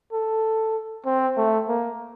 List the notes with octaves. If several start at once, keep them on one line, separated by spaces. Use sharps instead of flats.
A4
C4
A3
A#3